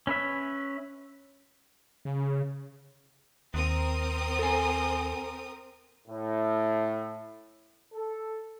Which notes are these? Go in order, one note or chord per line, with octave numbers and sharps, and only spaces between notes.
C#4 B4 E5
C#3
D#2 C4 A#4 D#6
A4 G#5
A2
A4